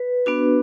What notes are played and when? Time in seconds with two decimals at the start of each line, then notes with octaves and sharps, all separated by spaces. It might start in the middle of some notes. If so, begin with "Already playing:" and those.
Already playing: B4
0.26 B3 D4 F#4